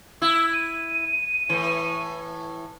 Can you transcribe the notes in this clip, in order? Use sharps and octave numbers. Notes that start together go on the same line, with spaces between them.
E4 E6
D#7
A2 E3